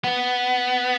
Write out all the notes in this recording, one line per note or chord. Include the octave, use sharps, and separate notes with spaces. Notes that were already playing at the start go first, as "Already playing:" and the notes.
B3